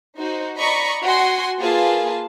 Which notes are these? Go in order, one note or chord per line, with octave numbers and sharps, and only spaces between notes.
D#4 F#4 C5
D5 D#5 A#5 B5 C#6
F#4 G#5 C6
A#3 F4 G#4 B4 A5